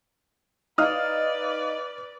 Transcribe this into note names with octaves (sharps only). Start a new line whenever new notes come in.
D#4 B4 D5 F5 D#6 F6